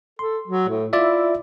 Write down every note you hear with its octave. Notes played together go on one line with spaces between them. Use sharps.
A4 C6
F#3
A2
E4 F4 D5 E5